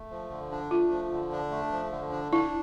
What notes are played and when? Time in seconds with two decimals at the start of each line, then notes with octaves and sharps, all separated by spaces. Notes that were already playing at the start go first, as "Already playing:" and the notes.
Already playing: A3
0.11 F3
0.31 D3
0.52 D4
0.71 A3 F4
0.91 F3
1.11 D3
1.32 D4
1.51 A3
1.72 F3
1.92 D3
2.12 D4
2.32 D4 E4